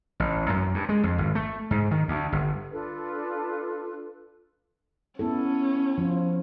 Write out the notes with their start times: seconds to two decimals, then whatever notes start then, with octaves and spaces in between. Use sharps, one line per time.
0.20 A1
0.50 F#2
0.74 G2
0.89 G#3
1.03 F2
1.18 G#1
1.35 A3
1.71 G#2
1.91 D#3
2.08 D2
2.32 G1
2.72 D4 F4 A4 B4
5.19 B3 C#4 E4 A4
5.98 F3 F4